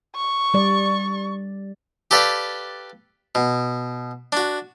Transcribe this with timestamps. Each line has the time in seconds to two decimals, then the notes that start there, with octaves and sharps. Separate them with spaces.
0.16 C#6
0.54 G3 D5
2.11 G4 A4 B4 D5 F5 G5
3.35 B2
4.32 D4 F#4